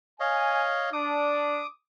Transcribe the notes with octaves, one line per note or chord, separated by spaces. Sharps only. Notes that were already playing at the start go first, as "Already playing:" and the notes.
C#5 D#5 F5 G#5
D4 D6 D#6